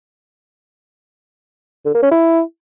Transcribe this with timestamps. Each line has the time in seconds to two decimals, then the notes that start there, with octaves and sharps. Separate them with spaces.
1.85 D3
1.94 A#3
2.03 C#4
2.11 E4